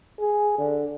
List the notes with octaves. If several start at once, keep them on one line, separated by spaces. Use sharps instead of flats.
G#4
D3